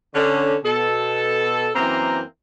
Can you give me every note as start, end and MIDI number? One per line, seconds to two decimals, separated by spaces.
0.15 0.56 50
0.15 0.56 61
0.65 1.70 47
0.65 1.70 69
1.75 2.21 42
1.75 2.21 52
1.75 2.21 58
1.75 2.21 60
1.75 2.21 82